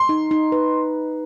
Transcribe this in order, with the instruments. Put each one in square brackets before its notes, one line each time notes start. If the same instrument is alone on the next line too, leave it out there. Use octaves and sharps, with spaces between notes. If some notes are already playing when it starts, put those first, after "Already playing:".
Already playing: [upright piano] C6
[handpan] D#4
D#4
B4